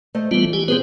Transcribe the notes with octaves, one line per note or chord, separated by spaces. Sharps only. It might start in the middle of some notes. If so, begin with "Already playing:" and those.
A3 C5 D#5
E3 G3 B3 F4 A4
G4 G#5
B3 C4 G#4 B4 C5